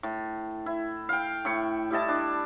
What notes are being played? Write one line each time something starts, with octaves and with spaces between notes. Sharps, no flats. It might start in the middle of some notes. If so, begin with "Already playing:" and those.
A2
E4
F5 G5
A2 E4 C#6
G3 E4 D#5 A5
D4